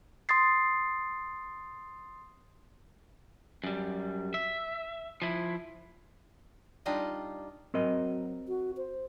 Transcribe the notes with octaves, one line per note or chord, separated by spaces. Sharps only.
C6 D#6 A6 C7
F#2 G3
E5
F3 E4
G3 D4 D#4 F4 G4 D#5
F#3 C4 A#4 D#5
F#4
C5